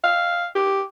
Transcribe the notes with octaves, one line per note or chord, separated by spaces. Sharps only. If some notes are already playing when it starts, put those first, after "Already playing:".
F5
G4